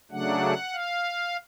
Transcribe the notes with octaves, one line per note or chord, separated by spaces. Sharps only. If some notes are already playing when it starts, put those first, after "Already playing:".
C#3 F#3 A3 D4 F#5
F5